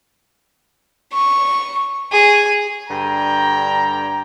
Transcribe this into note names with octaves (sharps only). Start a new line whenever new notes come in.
C#6
G#4
G2 D3 G5 A#5